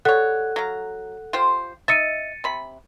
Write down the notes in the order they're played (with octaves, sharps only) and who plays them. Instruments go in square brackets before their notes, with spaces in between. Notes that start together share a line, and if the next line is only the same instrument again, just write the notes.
[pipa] G3 C#5 [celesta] A4 F#5 F#6
[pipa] F#3 F5 A#5
F4 G4 C5
[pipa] D#4 D#5 E5 [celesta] A6 C#7 D#7
[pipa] C3 B5